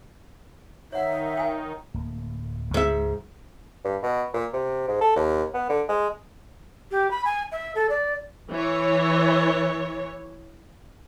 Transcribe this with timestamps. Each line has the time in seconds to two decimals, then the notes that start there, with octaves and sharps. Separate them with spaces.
0.92 D#3 D#4 C#5 E5 F#5
1.37 G5 G#5
1.94 D1 A#3
2.74 C#2 G#2 E5
3.85 G2
4.03 B2
4.34 A#2
4.53 C3
4.88 G#2
5.01 A4
5.16 D#2
5.54 B3
5.69 D3
5.89 G#3
6.91 G4
7.11 B5
7.25 G#5
7.52 E5
7.75 A4
7.89 D5
8.51 E3 C#5